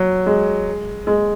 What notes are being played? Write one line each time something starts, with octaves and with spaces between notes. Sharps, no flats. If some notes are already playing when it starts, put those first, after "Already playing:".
Already playing: F#3
G#3
G#3